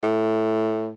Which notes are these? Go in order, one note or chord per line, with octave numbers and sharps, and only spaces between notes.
A2